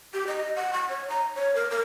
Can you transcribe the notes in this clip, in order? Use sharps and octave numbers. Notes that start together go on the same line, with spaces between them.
G4
D#5
F#5
C#6
C#5
A#5
C#5
A#4
A#4